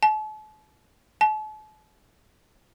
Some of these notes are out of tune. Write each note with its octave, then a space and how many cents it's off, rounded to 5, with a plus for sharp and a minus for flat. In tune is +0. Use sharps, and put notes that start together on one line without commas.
A5 -40
A5 -40